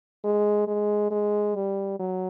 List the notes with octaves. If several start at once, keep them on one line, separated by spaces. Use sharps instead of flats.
G#3
G#3
G#3
G3
F#3